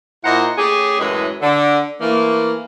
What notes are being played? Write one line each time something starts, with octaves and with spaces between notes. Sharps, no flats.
A#2 E4 C5 D#5 F#5 A#5
A3 C#4 G4 G#4
F#2 A2 E3 F#3 G#3
D3
E3 A3 A#3